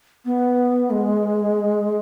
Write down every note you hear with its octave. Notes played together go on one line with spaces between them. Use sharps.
B3
G#3